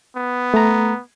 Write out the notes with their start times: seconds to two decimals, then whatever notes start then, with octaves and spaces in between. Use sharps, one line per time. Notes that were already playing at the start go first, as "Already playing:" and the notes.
0.16 B3
0.54 A3 A#5